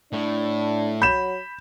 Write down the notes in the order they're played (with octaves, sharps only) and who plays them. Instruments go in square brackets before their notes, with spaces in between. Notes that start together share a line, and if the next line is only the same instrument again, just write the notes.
[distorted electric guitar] A2 [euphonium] D4
[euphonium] F#3 [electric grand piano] B5 [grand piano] G6 E7